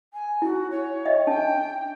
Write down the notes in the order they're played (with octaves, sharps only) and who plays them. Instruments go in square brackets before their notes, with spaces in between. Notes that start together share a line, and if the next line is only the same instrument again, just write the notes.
[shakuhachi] G#5
[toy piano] E4 [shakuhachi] F#4
[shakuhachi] C#5
[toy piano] D#5 E5 G5
[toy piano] D4 A5 [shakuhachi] G5